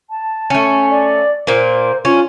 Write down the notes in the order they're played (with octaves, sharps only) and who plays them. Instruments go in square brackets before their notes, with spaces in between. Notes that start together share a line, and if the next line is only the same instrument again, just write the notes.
[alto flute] A5
[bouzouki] A3 C#4
[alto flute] D5
[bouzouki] A#2 A#3 [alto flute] C5
[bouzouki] C#4 [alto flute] F4